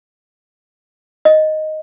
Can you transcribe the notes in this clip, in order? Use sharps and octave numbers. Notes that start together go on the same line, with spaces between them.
D#5